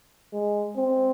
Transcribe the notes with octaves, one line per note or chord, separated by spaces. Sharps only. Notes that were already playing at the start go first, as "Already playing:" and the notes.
G#3
C4